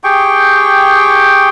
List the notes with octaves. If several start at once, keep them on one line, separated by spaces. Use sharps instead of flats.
G4 G#4 G5 C#6